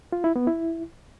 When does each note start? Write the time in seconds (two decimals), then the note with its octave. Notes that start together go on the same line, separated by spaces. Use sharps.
0.13 F4
0.24 E4
0.36 B3
0.47 E4